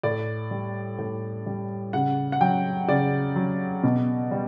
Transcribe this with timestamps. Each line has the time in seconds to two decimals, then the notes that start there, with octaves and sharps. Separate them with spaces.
0.03 A2 D5
0.51 G3
0.99 A2
1.46 G3
1.93 C#3 F#5
2.32 F#5
2.41 F#3 G5
2.88 C#3 D5
3.36 F#3
3.84 B2
4.31 G3